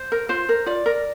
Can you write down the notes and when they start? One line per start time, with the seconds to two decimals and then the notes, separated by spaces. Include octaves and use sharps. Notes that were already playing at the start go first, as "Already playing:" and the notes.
Already playing: C5
0.12 A#4
0.29 F4 C5
0.49 A#4
0.66 F4 D5
0.86 A#4